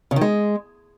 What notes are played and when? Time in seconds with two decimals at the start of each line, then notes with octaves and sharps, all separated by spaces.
0.11 C#3
0.16 D#3
0.21 G#3